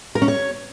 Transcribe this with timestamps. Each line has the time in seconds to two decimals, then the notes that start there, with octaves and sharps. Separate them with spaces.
0.15 A#4
0.22 C#4
0.28 C#5